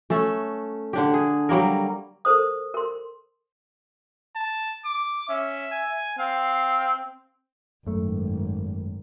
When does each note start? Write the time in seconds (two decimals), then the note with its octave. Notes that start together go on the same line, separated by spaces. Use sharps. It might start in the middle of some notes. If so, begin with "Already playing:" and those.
0.10 A3 C#4 A4
0.93 D3 D4 G4
1.14 G#4
1.49 F#3 G3 A#3 A#4
2.25 A4 A#4 C5 D#6
2.74 A#4 C6
4.36 A5
4.85 D6
5.29 C#4 E5
5.72 G#5
6.19 C4 F5
7.87 G#1 F#2 A3